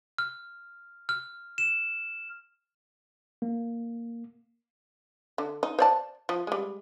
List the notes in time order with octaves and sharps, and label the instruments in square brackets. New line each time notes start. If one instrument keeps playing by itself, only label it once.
[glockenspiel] F6
F6
E7
[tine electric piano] A#3
[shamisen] D3
D#4
C5 D5 A5
F3
G3 G#3